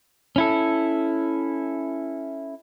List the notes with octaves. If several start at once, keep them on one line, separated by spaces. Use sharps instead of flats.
C#4 E4 A4